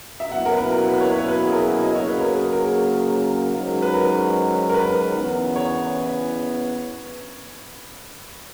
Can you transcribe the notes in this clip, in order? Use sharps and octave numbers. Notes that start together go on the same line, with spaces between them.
E5
B2 F#3 A#3 C#4 E4 F#5
A#4
B4
A#4
B4
C#5
B4
C#5
B4
G#4
A#4
D#5
C#3 F#3 A#3 C#5
B4
A#4
G#4
A#4
A#4
G#2 D#3 F#3 C#4
B4
A#4
A#4
B4
E2 C#3 E3 B3
C#5